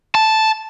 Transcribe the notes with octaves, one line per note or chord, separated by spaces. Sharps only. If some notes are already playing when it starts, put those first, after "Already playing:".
A5